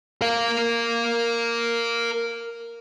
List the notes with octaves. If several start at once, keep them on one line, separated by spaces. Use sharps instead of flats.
A#4 F5